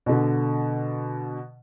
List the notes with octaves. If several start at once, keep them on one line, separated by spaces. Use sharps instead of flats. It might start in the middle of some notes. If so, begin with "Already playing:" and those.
B2 D3